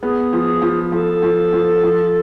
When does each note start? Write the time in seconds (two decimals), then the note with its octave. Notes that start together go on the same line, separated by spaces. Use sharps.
0.02 B3 G#4
0.33 F3
0.62 F3
0.92 F3 A4
1.23 F3
1.53 F3
1.83 F3